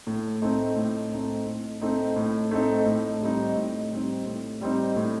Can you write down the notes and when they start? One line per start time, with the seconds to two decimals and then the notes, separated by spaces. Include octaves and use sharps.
0.07 A2
0.42 A3 C4 D#4
0.76 A2
1.12 A3 C4 D#4
1.46 A2
1.82 A3 C4 D#4
2.16 A2
2.51 A3 C4 D#4
2.86 A2
3.22 G3 C4 D#4
3.56 A2
3.91 G3 C4 D#4
4.26 A2
4.61 G3 C4 D#4
4.96 A2